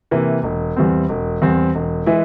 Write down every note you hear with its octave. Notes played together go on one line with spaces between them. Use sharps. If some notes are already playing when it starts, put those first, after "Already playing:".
C3 E3 A#3
E1
E2 E3 G3 C4
E1
E2 E3 G3 C4
E1
E3 G#3 E4